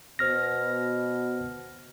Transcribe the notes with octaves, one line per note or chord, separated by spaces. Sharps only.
B2 C5 F6 A#6